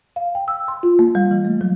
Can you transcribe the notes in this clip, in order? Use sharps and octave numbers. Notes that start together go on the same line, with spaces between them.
F5
G5
E6
C6
F4
A#3
G3
E3
A3
F#3